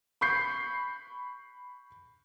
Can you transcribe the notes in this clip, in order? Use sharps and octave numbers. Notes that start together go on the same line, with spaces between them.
B5 C#6 G6 C7